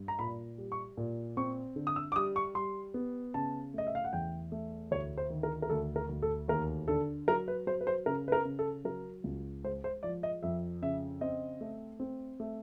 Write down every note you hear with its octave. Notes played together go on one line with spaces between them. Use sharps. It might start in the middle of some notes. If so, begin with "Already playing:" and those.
Already playing: G2
A#5
A#2 B5
G3
C#6
A#2
C4 C#6
D3
D#6
E6
D6
G3 D#6
C#6
G3 C6
B3
C#3 A5
A3 D#5
E5
F5
F#5
E2 G5
A3
D2 C#5
C5
D#3
A#4
A#4
D2 A4
A#4
D2
A4
D#2 A#4
D3 A4
F#3 A#4
B4
F#3 C5
B4
C5
C#3 A#4
B4
A#4
C#3
A4
F#3 A#4
C#2
G#3 C5
C5
F3 D5
D#5
F2 E5
C#3 E5
C4 D#5
A3
C4
A3